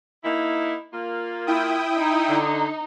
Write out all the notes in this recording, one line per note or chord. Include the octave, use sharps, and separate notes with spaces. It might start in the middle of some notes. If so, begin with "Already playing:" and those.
A#3 D#4 E4
A#3 F4
E4 G5 D#6
D#4
D3